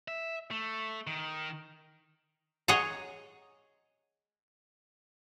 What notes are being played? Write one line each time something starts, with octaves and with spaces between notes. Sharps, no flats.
E5
A3
D#3
G#4 C#5 D#5 F#5 A#5